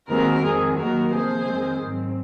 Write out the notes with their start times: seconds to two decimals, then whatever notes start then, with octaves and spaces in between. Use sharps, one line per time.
0.08 D#2 D#3 G#3 C4 F#4 A#4
0.43 F2 D#3 G#3 C4 G#4
0.78 D#2 D#3 F#3 A#3 F#4 A#4
1.13 C3 F3 A#3 G#4 C5
1.48 F2 D#3 G#3 C4
1.83 G#2 F#3 C4